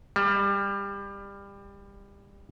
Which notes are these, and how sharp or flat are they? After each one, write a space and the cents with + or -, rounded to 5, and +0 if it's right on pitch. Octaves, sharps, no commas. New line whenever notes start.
G3 +25